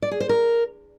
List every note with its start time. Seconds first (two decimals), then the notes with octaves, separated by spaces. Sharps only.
0.02 D5
0.11 G#4
0.20 C5
0.29 A#4